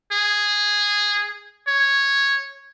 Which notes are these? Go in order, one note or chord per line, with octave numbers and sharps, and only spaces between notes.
G#4
C#5